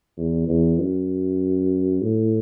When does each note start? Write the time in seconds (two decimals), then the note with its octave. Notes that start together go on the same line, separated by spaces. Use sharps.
0.18 E2
0.49 E2
0.79 F#2
2.02 A2